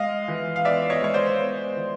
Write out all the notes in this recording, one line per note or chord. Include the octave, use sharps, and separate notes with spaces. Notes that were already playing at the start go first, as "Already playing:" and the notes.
Already playing: G#3 D#5 F5
E3
F5
B3 D5 E5
C#5 D#5
G#3 C#5
C5 D5
B3
E3